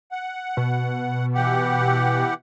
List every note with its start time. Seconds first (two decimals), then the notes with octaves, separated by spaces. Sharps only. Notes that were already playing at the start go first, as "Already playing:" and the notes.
0.12 F#5
0.57 B2
1.35 E3 G4 F#5